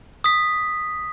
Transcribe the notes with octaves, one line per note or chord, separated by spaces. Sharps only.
D#6 B6